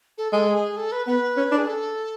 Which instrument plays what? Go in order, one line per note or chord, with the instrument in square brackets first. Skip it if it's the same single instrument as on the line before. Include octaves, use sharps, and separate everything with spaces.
[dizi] A4
[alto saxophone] G#3 [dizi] A4
[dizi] G#4
A4
B4
[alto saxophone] B3 [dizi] B4
[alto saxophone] C#4
D4
[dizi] G#4
A4